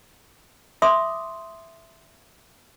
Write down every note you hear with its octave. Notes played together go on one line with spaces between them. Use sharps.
E5 C6 D6 D#6